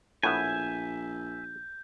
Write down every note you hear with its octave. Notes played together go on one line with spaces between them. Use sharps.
A#1 A2 B3 E5 G#5 G6